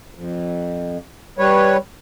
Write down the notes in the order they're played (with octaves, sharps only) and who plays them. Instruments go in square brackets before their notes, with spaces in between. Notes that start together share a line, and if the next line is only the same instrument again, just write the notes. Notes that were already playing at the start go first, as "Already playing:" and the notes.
[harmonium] F2
G3 B4 C#5